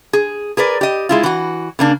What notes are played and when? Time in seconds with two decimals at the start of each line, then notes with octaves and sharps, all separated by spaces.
0.13 G#4
0.57 G#4 A#4 B4 D5
0.81 G4 D#5
1.09 G#3 E4 F4
1.23 E3 F#4
1.79 C#3 A#3 D4